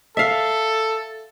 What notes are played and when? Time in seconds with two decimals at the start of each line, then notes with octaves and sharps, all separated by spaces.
0.17 A4 E5 F5